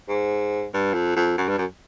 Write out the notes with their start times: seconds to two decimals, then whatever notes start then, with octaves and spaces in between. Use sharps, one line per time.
0.09 G#2
0.74 G2
0.94 F2
1.16 F2
1.38 F#2
1.49 G2
1.58 F#2